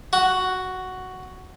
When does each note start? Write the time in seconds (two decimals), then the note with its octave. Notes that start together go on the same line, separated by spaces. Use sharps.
0.13 F#4